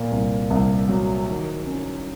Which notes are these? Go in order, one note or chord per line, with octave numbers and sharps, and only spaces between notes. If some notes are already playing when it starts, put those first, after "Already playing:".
Already playing: A#2
C2
C2
F#3
D#3
C#4